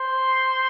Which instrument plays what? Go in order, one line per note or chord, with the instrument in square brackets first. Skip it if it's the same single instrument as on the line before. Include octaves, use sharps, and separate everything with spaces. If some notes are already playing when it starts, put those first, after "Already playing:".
Already playing: [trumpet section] C5 C6